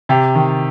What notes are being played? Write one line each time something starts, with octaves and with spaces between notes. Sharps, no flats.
C3 G4
D#3